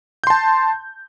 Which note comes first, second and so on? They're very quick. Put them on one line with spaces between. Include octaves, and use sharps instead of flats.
G6 C6 A5